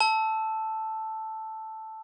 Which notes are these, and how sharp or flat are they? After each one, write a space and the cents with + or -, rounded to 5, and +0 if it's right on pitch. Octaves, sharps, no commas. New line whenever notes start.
A5 +0 E6 +0